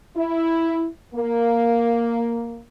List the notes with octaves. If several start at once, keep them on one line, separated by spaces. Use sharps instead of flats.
E4
A#3